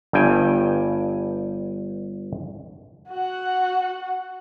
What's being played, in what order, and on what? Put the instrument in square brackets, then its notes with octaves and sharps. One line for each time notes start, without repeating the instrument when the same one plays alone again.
[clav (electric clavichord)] G1 G2 G5 G#5
[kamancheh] F#4 F#5